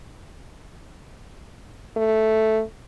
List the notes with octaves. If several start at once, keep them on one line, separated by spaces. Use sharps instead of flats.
A3